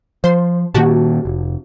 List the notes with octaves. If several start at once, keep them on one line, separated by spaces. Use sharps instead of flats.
F3 C5 C6
A#2 D#3 A#3 F#4 G4 A5
F1